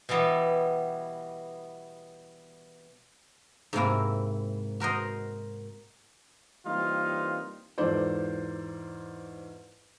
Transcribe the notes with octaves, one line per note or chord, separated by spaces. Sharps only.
B2 E3 G3 B3 E4
G#2 C3 A#3 E4
F#4 A#4 C5 D#5
E3 G3 A#3 C4 D#4 F4
E2 G#2 F4 A4 C5 D5